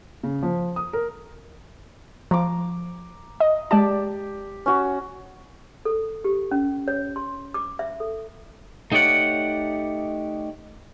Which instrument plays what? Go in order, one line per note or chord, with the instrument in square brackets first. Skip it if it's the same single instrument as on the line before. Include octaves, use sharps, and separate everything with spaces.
[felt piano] C#3
F3
D#6
A#4
[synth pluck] F3 [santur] A#5 D6
[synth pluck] D#5
[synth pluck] G#3 D5 A5 [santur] G4
[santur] C#4 F#4
[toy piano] A4
G4
C#4
C#5
C6
D6
E5
A4
[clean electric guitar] A3 D#4 G4 C#5 D5 F#5